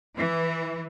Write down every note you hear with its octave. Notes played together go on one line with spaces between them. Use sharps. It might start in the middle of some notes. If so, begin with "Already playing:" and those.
E3